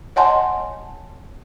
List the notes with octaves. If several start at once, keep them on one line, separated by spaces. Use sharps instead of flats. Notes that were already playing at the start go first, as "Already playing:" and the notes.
C#5 D#5 F#5 G#5 A5 C6